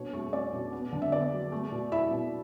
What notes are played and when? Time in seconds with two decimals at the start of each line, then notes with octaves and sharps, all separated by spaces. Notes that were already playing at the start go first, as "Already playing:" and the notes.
Already playing: B2 D4 C#5
0.13 A3
0.33 C#4 D5
0.53 B2
0.73 B3
0.92 D3
1.02 E5
1.12 B3 D5
1.32 F#3
1.52 A3
1.72 B2
1.92 E4 E5
2.11 B2